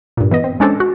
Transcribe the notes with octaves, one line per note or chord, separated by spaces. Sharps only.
G2 A#2
E3 B3 D#5
C4
G#3 C#4 D4 A4 C5
F#4